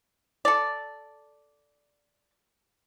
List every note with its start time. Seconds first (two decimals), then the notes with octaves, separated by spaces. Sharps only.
0.45 A4 D5